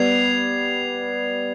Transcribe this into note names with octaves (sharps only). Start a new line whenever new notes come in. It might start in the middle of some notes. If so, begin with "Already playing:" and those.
Already playing: G3 B3 G#6 C7 F7